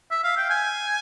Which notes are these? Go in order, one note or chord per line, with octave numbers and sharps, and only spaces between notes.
E5
F5
G5
G#5